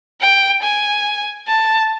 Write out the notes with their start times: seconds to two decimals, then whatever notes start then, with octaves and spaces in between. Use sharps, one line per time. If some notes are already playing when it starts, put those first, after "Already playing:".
0.21 G5
0.62 G#5
1.47 A5